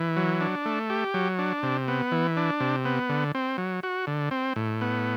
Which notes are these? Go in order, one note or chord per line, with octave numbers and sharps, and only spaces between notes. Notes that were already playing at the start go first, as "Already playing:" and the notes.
Already playing: E3
F#3
D4
A3
G4
F#3
D4
C3
B3
E3
D4
C3
B3
D3
C4
F#3
F#4
D3
C4
A2
B3